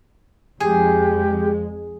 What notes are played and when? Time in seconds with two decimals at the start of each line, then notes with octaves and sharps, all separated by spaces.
0.60 F2 G#3 G4 G#4